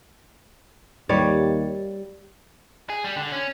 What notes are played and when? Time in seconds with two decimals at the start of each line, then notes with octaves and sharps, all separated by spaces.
1.09 D#2 G3 C#5 D5
2.90 G#4
3.04 G3
3.16 D3
3.32 C#4